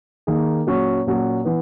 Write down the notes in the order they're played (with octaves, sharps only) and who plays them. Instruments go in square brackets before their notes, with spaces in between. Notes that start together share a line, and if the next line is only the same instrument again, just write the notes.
[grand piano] D#3 A#3 D#4 G#4
A#2 F#3 C#4 F#4
A#2 F#3 C#4 F#4
E3 B3